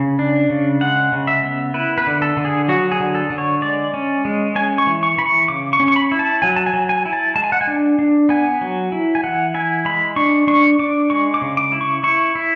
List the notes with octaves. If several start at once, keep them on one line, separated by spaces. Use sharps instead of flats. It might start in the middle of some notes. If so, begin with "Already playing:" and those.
Already playing: C#3 G#5
D4
C#3
G#3 F#5
C#3
E5
B3
E4 B4
B4
D3
A4
D3
G#4
F#3 F#4
G#4
D3
A4
D3
C#5
G#3 D5
C#4
G#3
C#4 G#5
C#6
E3
C#6
E3 B5
C#6
C#3 D6
C#6
C#4
C#6
B5
E4
A5
F#3 G#5
A5
G#5
F#3
G#5
E4
A5
G#3 A5
G#5
F#5
G#5
D4
D4
B3 G#5
F#3
E4
G#5
E3 F#5
E4 G#5
G#3 B5
D4 C#6
D4 C#6
D4 D6
G#3 C#6
D6
C#3
D6
E4
C#6
E4 C#6
E4